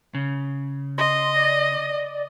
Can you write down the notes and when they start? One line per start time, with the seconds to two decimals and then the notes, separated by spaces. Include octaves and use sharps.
0.15 C#3
0.98 D#5 C6
1.36 D5